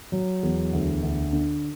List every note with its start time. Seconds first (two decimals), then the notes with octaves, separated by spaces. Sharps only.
0.12 F#3
0.43 E2
0.73 D2
1.03 D2
1.33 D3